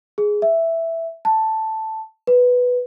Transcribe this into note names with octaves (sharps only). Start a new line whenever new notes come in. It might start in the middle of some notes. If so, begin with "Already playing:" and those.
G#4
E5
A5
B4